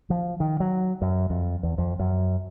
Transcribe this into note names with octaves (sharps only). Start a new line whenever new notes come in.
F3
D#3
F#3
F#2
F2
E2
F2
F#2